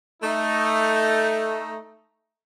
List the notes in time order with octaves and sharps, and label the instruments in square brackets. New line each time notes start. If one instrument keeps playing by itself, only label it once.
[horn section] A3 D#4